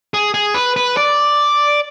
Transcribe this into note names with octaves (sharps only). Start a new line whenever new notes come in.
G#4
G#4
B4
B4
D5